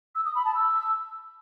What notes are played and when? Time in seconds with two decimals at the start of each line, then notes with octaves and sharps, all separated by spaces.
0.15 E6
0.25 D#6
0.35 B5
0.45 A5
0.55 E6